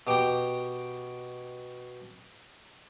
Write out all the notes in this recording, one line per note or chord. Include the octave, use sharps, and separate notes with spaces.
B2 G4 G5 A#5